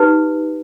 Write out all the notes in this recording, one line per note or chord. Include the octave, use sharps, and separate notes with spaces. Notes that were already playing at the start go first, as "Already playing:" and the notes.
Already playing: D#4 G4 B4